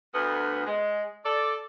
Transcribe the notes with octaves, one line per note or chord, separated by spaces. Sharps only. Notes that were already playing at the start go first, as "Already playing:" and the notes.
D2 B3
G#3
A4 D5